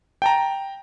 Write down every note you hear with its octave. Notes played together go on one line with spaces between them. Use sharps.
G5 A5 A#5